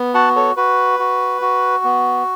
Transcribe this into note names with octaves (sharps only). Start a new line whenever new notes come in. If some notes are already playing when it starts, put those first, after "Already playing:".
Already playing: B3
F#4 F#5 A5
A4 C#5
F#4 B4
F#4
F#4
B3